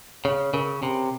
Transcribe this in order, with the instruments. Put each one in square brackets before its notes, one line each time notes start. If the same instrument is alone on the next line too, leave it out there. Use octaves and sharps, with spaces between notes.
[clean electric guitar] C#3 [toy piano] C#5
[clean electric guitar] C#3 [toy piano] A#4
[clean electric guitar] C3 [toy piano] B5